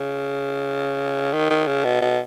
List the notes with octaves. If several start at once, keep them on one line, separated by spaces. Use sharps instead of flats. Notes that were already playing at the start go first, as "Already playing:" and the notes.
Already playing: C#3
D#3
D#3
C#3
B2
B2